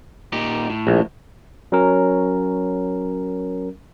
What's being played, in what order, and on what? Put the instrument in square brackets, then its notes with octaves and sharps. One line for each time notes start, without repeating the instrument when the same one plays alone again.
[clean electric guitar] A#2 D#4 G4
A2
[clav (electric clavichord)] A#1
[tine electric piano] F#3 C#4 A#4